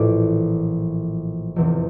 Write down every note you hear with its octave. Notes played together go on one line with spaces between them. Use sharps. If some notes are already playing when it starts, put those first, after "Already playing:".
Already playing: A#1 A2 E3 D5
F1 E2 E3